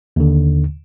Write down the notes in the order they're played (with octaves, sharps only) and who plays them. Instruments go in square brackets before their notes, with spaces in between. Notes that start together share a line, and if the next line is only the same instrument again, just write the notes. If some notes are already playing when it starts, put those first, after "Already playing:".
[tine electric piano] D#2 D3